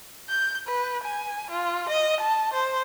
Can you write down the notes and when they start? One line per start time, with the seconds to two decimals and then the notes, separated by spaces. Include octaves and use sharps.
0.30 G6
0.68 B4
1.04 G#5
1.51 F4
1.89 D#5
2.20 A5
2.53 C5